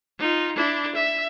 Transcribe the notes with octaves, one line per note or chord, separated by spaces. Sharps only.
D#4 F4
D4 E4
E5